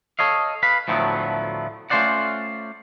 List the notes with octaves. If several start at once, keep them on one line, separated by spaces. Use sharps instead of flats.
A4 C#5 D#5 F5
B4 F5 B5
D2 A2 F3 F#3 A3 B3
A3 C#4 F4 C5 D5 F#5